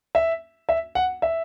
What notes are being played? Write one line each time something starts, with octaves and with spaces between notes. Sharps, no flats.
E5
E5
F#5
E5